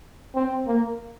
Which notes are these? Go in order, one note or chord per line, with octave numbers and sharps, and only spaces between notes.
C4
A#3